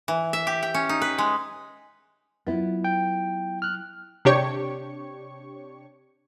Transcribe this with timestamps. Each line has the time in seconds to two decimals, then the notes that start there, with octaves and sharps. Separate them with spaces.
0.08 E3
0.33 E5
0.47 G4
0.63 G5
0.74 C#4
0.89 D#4
1.02 B4
1.18 G#3
2.47 F#3 B3 E4 F4
2.84 G5
3.62 F6 F#6
4.25 C3 D4 G4 C#5 C#6